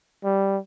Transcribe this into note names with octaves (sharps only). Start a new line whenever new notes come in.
G3